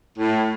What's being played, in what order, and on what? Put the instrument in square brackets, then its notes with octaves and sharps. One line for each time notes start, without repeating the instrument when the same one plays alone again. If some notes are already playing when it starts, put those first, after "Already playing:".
[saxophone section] A2